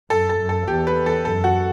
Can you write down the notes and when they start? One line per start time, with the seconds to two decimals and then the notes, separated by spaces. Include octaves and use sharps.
0.10 F#2 A4
0.29 A4
0.39 F#2
0.49 A4
0.68 E2 G4
0.87 B4
1.06 A4
1.25 F#2 A4
1.44 F#4